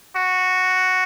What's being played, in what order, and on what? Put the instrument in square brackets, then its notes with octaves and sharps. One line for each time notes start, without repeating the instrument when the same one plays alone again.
[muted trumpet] F#4